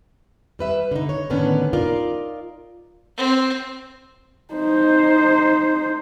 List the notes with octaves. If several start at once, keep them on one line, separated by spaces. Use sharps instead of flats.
G3 B4 E5
D3 D#4
C#5
A2 D3 D#3 B3 C#4 D4
D#4 F4 A#4 D5
C4
D#4 C5